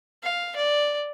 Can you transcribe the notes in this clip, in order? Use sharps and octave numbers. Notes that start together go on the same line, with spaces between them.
F5
D5